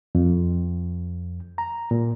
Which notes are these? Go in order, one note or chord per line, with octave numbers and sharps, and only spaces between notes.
F2
A#5
A#2